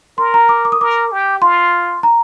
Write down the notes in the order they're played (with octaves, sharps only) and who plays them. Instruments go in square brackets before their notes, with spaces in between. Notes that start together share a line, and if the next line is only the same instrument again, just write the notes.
[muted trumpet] A#4 [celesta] C6
[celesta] A#5
D6
D6
D#6
[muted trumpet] A#4 [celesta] D6
[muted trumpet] G4
[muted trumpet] F4 [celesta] C6
[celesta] A#5